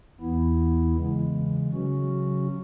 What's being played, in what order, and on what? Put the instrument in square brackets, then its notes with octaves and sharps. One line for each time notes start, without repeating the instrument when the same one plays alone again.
[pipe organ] E2 E3 B3 E4
C#3 E3 G#3
C#3 F#3 C#4 F#4